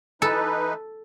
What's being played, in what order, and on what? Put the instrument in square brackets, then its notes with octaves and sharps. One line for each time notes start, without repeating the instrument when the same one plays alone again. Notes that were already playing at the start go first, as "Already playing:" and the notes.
[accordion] E3 D#4 B4 [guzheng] A4